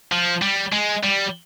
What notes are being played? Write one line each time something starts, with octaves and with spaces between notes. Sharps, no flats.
F3
G3
G#3
G3